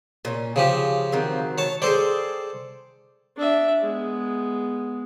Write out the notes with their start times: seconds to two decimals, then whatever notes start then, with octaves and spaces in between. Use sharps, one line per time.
0.25 A#2 C#4
0.56 C#3 F3 G4 G#4
1.12 D#3 F#3 C4
1.58 C#5 A5
1.82 G#4 A4 C5 D5 G5
3.37 D4 E5
3.83 G#3 B3